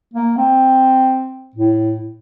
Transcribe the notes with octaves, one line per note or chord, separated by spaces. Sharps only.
A#3
C4
A2